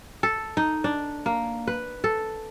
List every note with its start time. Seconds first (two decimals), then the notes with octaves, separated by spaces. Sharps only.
0.23 A4
0.57 D#4
0.84 D4
1.26 A#3
1.68 B4
2.04 A4